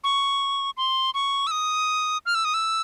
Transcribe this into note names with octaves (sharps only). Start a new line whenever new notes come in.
C#6
C6
C#6
E6
D#6
F6
E6
D#6
E6